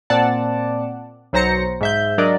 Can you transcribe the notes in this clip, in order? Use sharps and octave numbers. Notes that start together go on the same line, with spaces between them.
A#2 C4 D5 F#5 A5
B1 F#3 C5 A#5 A#6 C#7
G#2 E5 G6
F#3 D4 A#4 D5 D#5